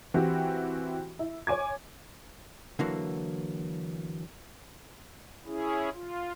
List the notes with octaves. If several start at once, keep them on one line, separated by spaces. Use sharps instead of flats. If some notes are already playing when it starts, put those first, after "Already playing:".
E3 C4 F#4 G4
E4
C#5 G#5 D6 G#6
D3 E3 F#3 A#3
C#4 E4 G#4
F4